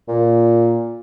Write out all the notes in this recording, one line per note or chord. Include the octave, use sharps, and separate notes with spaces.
A#2